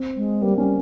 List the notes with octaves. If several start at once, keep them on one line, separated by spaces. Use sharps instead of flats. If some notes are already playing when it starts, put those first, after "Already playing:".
Already playing: C4
G#3
G3 A#3
G3 C#4